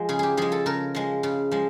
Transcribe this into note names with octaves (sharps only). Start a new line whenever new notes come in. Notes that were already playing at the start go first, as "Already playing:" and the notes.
Already playing: F3 G#3
C#3 G#4
G4 G#4
F3 G#3 G#4
A4
C#3 A#4
F3 G#3
C#3
F3 G#3